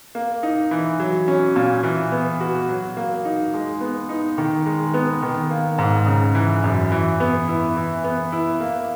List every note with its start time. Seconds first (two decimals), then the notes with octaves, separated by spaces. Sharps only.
0.15 A#3
0.43 D#4
0.71 E3
1.00 F#3
1.28 C#4
1.56 A#2
1.83 E3
2.12 B3
2.41 F#4
2.69 F#3
2.97 A#3
3.25 D#4
3.54 G#3
3.81 B3
4.09 D#4
4.38 D#3
4.66 G#3
4.94 B3
5.23 D#3
5.51 A#3
5.78 G#2
6.07 C#3
6.35 E3
6.64 F#2
6.92 E3
7.20 B3
7.48 E4
7.77 E3
8.04 B3
8.32 E4
8.60 A#3